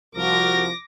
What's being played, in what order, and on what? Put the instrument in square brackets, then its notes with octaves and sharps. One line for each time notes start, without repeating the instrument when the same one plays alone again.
[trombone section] C2 F3 [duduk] F#4 [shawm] A#4 [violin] D6 A#6